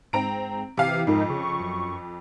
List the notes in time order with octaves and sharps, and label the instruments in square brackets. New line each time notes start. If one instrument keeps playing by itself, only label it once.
[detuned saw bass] G#2 [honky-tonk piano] C4 A#5 D7
[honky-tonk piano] C3 F5 C7 [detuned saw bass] E3
[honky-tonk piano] F2 [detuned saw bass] G#2 [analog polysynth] D#4 A#4
[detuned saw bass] C#3 [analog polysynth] C#6
[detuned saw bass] F#2